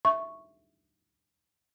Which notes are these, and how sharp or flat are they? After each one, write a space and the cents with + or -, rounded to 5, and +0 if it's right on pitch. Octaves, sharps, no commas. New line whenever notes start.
E5 +0 C#6 +0